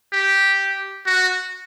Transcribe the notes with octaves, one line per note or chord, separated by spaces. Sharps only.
G4
F#4